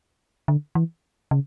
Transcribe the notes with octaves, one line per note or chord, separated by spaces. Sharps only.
D3
E3
C#3